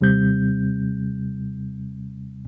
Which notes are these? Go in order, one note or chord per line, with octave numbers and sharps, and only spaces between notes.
D#2 C3 G3 C4 G6